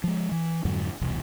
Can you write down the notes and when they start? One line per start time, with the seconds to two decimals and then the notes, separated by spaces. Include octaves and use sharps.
0.04 F3 G#3
0.32 E3
0.65 F2 G#2 D3 F#3
1.02 E1 C2